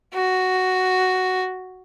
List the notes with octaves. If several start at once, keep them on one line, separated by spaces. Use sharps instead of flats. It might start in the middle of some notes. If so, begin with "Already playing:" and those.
F#4